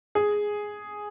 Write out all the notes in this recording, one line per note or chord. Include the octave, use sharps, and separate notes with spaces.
G#4